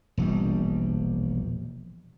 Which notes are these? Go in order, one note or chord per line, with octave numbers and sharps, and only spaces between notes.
E1 A#1 G3